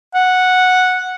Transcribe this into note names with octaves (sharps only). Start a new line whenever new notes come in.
F#5